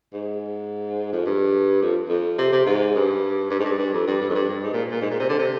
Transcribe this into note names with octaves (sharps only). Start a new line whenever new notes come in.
G#2
F2
G2
F2
F2
C3
C3
G#2
G2
G2
G#2
G2
G2
F2
G2
G2
F2
G2
G2
G#2
A#2
A#2
G#2
A#2
C3
D3
C3